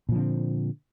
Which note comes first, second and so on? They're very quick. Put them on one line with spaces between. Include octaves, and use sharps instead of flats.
A#2 F3 D3 C4